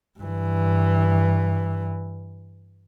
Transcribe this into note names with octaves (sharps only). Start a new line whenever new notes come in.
G2 E3